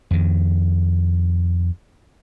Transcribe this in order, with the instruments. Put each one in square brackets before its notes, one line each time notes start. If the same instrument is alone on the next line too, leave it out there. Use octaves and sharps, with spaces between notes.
[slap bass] F2 D#3